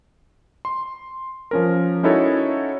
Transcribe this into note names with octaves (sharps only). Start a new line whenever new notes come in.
C6
F3 C#4 A#4
C#4 D#4 E4 F#4 A4 C#5